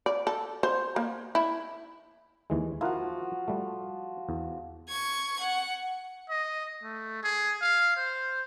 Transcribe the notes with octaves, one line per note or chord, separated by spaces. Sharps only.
D5
A4
C5
A#3
E4
D#2 E3 G#3
F3 E4 F#4 A#4 F#5
G3 A3
E2
C#6 G#6
F#5
D#5
A3
G#4
F5
C5